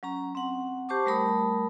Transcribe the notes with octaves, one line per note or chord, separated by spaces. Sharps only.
F#3 C#4 A#5
C4 F#5
G4 C5 A5 C#6 D6
G3 A3 A#4 A5 B5 D#6